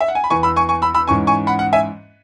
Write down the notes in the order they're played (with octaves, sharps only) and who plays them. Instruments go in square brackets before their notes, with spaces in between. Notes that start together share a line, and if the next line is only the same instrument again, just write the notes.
[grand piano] E5
F#5
G#5
B5
E2 E3 B3 G#5 C#6
B5 E6
G#5 C#6
G#5 C#6
B5 E6
B5 E6
G#2 E3 C#4 G#5 C#6
G#5 C#6
F#5 B5
F#5
E5 G#5